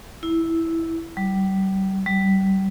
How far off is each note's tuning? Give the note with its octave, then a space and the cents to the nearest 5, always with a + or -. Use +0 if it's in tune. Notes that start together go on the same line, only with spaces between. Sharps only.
E4 -5
G3 -35
G3 -30